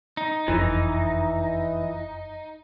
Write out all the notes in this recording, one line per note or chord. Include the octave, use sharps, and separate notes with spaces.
D#4
F#1 F2 E3